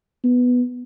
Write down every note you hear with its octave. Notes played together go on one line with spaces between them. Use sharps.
B3